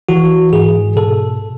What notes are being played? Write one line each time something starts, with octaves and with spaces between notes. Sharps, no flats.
E3 F#4
G#2 G#4
B2 A4